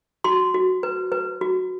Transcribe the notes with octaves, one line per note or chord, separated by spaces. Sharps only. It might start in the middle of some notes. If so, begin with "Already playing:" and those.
F#4 C6
F#4
B4
B4
F#4